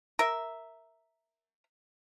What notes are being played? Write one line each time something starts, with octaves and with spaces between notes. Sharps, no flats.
A#4 E5